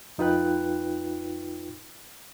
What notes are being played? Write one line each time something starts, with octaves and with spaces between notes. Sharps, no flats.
F2 D#4 F4 B4 G5 F#6